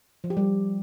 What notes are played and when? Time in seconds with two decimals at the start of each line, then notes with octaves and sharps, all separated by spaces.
0.24 F3
0.30 G4
0.37 G3